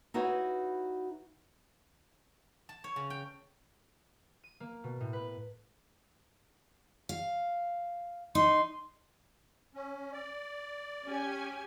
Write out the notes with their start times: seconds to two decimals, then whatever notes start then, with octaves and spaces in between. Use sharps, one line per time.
0.14 D#4 E4 F#4 B4 C#5
2.69 A5
2.84 C#5
2.96 C#3
3.10 G5
4.44 D#7
4.60 A#3
4.84 B2
5.01 A2
5.13 B4
7.09 F5
8.35 D#4 C6
9.75 C#4
10.12 D5
11.05 C#4 G4 G#5